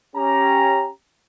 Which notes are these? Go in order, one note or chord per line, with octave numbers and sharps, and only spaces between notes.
C#4 G4 A#5